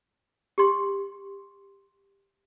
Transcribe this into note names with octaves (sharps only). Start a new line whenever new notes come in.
G4 C6